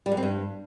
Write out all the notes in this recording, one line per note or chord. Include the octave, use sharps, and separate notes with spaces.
G3
F#2
C4
G2